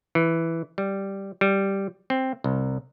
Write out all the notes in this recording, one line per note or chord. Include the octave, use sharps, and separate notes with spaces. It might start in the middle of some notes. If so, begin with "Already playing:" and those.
E3
G3
G3
C4
C2